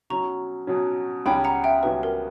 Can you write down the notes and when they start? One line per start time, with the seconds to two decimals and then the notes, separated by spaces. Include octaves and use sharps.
0.10 B2 F#3 C#4 A#5 C#6
0.67 B2 F#3 C#4
1.26 C#2 B2 G3 C#4 F#4 G5 B5
1.44 F#5 A#5
1.64 E5 G5
1.83 C#2 B2 G3 C#4 F#4 B4
2.03 A#4